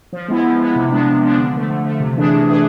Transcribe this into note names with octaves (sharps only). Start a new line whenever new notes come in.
F3
G#3 B3 E4
F3
G#3 B3 E4
C3
F3 G#3 B3 D4
C3
F3 G#3 B3 D4
D3
F3 A3
D3
F3 A3
C3
E3 A3 D4 G#4
C3
E3 A3 D4 G#4